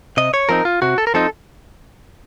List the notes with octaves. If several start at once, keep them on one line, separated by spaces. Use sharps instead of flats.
C3 D#5
C#5
F3 C4 D#4 A#4
F4
C3 F#4
A4
A#4
F3 C4 D#4 A4